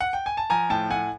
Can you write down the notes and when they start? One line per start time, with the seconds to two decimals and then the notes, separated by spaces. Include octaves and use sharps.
0.01 F#5
0.13 G5
0.26 G#5
0.37 A5
0.50 F3 G#5 A#5
0.70 A2 G5 A5
0.90 A2 F#5 G#5